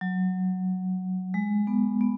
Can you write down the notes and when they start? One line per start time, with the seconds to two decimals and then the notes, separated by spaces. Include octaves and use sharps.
0.01 F#3
1.34 G#3
1.67 B3
2.01 B3